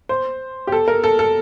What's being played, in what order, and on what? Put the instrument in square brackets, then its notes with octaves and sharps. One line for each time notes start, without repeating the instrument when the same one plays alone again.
[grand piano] C5
G4
A4
A#4
A4
A4